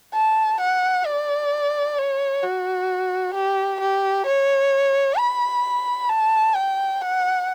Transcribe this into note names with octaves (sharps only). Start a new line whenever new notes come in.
A5
F#5
D5
C#5
F#4
G4
G4
C#5
B5
A5
G5
F#5